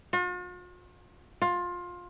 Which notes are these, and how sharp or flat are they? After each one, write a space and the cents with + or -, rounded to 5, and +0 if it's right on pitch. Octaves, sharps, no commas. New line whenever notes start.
F4 +45
F4 +20